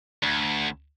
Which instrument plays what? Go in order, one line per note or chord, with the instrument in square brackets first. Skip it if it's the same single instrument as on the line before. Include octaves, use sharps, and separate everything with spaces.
[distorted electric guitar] D2